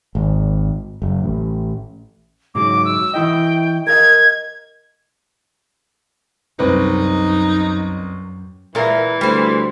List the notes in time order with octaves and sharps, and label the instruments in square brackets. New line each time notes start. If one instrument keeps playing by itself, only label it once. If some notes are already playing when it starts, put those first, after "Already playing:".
[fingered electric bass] G#1
F#1
A1
[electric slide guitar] G#2 C#3 F#3 [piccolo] D6
[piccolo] E6
[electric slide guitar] E3 E4 D#5 [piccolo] G5
[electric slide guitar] A#4 D#5 F5 [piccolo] G#6
[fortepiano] C2 B4 [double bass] F#2 [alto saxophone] D#4
[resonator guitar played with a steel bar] A#2 A#4 [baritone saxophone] E3 [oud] G#3 E4 E5
[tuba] D2 [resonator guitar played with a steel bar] G3 C5